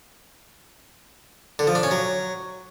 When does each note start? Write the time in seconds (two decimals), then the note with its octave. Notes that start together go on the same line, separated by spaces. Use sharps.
1.59 D3
1.67 F3
1.75 D4
1.83 C#4
1.91 F#3